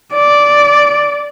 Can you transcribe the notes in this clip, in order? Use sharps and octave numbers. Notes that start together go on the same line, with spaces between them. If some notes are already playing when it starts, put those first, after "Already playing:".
D5